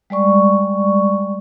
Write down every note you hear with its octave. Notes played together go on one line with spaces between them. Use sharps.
G3 G#3 D5 C#6